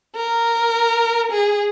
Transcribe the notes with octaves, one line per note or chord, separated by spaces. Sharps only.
A#4
G#4